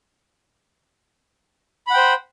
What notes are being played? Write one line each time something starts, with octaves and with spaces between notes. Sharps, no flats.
C5 F#5 G5 B5